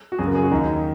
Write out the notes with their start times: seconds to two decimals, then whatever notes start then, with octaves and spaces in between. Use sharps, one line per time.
0.12 F#4
0.18 F#2 C#3 G#4
0.27 A#4
0.35 G#4
0.43 F#4
0.51 D#2 D#3 D#4